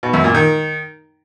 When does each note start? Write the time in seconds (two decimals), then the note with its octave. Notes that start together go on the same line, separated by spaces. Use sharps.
0.03 B2
0.13 F#2
0.24 A#2
0.34 D#3